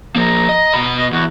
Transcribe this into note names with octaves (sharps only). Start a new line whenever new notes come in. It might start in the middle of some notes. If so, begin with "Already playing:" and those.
F3 A#3 A#5
D#5
B2 B5
D#5
E2 F#4